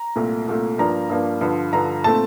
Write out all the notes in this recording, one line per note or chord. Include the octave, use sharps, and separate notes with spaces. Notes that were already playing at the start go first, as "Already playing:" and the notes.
Already playing: A#5
C2 A#2 A3
C2 A#2 A3
G2 F3 A#3 D4 A#5
G2 F3 A#3 D4
G2 D3 F3
G2 D3 F3 A#5
A#2 A3 C4 A5